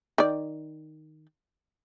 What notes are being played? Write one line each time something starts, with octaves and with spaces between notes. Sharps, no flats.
D#3 D5